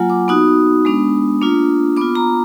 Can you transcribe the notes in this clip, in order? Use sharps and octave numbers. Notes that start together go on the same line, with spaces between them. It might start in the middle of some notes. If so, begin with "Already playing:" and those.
Already playing: F#3 A#3 F4 F#5 G#5
D6
B3 D#4 F#4 D#6
G#3 B3 D4
A#3 D4 F4
B3 F4 D6
A#5